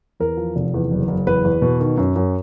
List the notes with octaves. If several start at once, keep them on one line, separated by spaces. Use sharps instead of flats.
E2 A#4
F3
F1
E2
F#1
F#1
E2 B4
E2
B2
D#3
F#2
F#2